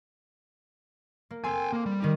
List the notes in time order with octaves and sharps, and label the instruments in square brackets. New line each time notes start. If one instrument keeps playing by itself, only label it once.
[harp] A#3
[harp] C4 A4 C6 [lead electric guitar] G5 G#5
[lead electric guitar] A#3
G3
[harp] D#3 D#4